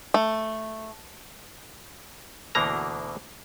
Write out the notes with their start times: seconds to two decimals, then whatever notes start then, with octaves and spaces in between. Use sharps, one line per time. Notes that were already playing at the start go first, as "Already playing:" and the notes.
0.14 A3
2.55 D2 B2 D3 E3 A#3 A#5